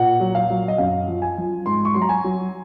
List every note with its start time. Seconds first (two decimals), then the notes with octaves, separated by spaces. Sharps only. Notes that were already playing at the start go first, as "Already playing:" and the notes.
Already playing: A#2 F#5
0.20 F#3
0.35 F5
0.50 F#3
0.68 D#5
0.78 F#2 F5
1.08 F3
1.22 G#5
1.38 F3
1.66 G#2 C6
1.85 C#6
1.94 F#3 C6
2.02 A#5
2.09 G#5
2.24 F#3